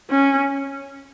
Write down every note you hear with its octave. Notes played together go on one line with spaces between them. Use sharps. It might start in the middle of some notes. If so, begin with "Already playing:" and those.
C#4